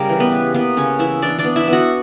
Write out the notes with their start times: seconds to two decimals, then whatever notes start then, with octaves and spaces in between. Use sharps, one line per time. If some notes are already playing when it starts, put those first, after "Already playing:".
Already playing: C#3 G3 G4 A#4
0.09 E3
0.20 B3 B4
0.32 C#3
0.54 A#3 B3 B4
0.77 C#3 C#4 C#5
0.99 E3 E4 E5
1.22 E3 D4 D5
1.39 D4 D5
1.44 B3
1.56 E4 E5
1.68 B3 F#4 F#5